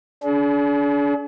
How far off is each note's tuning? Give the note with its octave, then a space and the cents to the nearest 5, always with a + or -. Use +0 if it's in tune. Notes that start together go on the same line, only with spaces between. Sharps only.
D4 -35 G#4 +40